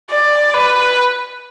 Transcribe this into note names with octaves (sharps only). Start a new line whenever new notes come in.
D5
B4